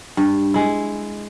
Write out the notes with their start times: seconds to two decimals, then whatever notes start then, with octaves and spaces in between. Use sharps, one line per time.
0.17 G2
0.54 G#3 E4